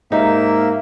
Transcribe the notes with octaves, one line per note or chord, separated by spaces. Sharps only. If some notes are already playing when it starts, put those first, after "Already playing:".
G#2 A#3 D#4 G4 E5